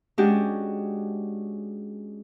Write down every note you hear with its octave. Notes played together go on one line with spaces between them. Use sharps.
G#3 C#4 D4 F#4 G4